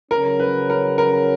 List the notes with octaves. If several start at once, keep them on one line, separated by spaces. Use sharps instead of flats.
C#3 F#3 C#4 A#4
B4
A#4
A#4